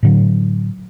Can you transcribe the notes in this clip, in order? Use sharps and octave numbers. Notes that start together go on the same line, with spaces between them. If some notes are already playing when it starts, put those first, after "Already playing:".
A2 D3 F#3